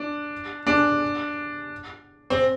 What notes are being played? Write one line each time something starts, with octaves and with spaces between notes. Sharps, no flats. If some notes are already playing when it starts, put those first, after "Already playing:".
Already playing: D4
D4
C4